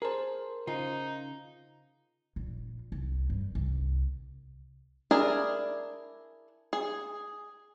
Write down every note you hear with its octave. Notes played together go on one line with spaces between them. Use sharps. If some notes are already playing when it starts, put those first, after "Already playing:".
G#4 A#4 C5 A5
C#3 D#4 F4
A#1
C2
G2
C2
D4 E4 G#4 A#4 D5
G#4